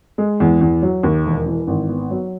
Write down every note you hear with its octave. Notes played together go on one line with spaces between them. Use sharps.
G#3
E2
E2
F#3
D#2
E1
E3
G#1
B3
F#3